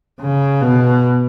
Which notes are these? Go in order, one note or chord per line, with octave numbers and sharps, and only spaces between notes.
C#3
B2